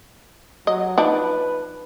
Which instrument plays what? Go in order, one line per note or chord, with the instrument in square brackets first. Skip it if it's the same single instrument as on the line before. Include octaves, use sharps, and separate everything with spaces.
[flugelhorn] F#3 [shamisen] D#5
[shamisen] F3 D4 D#4 [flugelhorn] B4